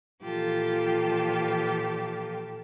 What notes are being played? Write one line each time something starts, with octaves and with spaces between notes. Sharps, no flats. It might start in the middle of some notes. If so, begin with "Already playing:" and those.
A#2 E3 F3 F4 G4 A4